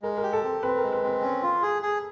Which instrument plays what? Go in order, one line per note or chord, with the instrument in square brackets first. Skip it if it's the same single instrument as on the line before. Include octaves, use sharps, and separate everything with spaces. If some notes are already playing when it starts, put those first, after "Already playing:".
[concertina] G#3 [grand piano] A#4
[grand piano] A#4
[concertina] G4
[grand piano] A4
[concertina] C4
[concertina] C4 [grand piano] B4
[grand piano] A#4
[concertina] G#3
[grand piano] B4
[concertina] C4 [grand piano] B4
[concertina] C#4
F4
G#4
G#4